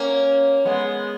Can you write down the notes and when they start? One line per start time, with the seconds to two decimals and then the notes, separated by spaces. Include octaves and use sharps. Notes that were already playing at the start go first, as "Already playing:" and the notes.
Already playing: A#3 C#4
0.65 G#3 B3